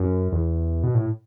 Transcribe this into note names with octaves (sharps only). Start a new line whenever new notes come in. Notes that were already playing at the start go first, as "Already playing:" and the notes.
Already playing: F#2
E2
B2
A2